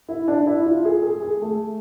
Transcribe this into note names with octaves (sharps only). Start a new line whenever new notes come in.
E4
D4
E4
F4
G#4
G#4
G#4
A3